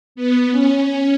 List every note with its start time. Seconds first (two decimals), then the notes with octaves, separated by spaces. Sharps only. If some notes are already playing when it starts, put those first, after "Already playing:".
0.15 B3
0.51 C#4